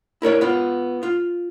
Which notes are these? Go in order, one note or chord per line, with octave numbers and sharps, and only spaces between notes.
E4 A#4 C#5 D5
B3 F4
F4